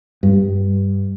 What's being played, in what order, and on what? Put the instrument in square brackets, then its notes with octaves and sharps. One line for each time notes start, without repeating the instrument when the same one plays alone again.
[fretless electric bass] G2